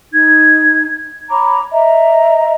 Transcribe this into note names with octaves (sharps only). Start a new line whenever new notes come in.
D#4 G#6
C#5 A#5 B5 D6
D#5 E5 A#5